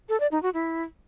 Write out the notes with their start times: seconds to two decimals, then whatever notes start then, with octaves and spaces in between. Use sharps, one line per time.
0.09 A4
0.20 D5
0.31 D#4
0.43 F#4
0.54 E4